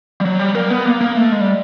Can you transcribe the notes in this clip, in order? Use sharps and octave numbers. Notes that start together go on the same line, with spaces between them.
G3
F#3
G3
A#3
B3
A#3
A#3
A3
G#3
G3